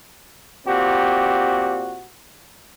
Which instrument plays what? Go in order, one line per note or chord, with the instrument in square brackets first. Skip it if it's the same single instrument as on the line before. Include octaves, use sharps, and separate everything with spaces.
[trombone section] A#2 C4 F#4 G4